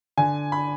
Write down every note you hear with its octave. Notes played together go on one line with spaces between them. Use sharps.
D3 G#5
B5